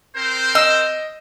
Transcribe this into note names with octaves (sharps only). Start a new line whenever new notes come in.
C4 A#4 C5
D#5 E6